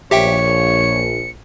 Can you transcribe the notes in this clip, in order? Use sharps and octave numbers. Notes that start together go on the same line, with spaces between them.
A#1 G4 C#5 E5 G5 C#7